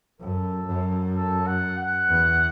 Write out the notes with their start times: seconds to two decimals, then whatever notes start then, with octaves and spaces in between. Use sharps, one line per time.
0.20 F#2 A4
0.68 F#2
1.16 A4
1.46 F#5
1.78 F#5
2.10 E2